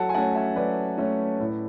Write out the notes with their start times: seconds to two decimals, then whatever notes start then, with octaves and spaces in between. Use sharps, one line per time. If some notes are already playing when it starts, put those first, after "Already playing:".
Already playing: F#3 A4 C#5 F#5 A5
0.09 G#5
0.14 A3 C#4 F#5 A5
0.35 E5 G#5
0.56 F#3 B4 D5
0.98 A3 C#4
1.40 A2